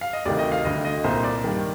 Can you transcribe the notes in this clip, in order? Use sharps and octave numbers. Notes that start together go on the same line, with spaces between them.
F5
D#5
D2 C3 D#3 D5
D#5
F5
D2 D3 D#5
D#5
C2 A#2 C5
D5
G2 D#3